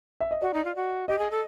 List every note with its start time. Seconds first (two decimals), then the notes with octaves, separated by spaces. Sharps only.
0.20 E5
0.31 D#5
0.42 F#4 D5
0.54 D#4
0.65 F4
0.76 F#4
1.08 G4 D#5
1.18 G#4
1.31 A4